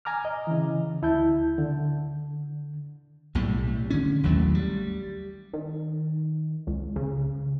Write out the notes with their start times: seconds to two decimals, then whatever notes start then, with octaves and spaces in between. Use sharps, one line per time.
0.05 G#5 A#5 D6 F6
0.25 D#5
0.47 C#3 E3
1.02 D2 E4 A5 G6
1.58 D3
3.35 B1 A2 C3 G3
3.90 D3 C#4
4.23 A1 D#2 F#3 A3
4.55 G3
5.53 D#3
6.67 C#2
6.96 C#3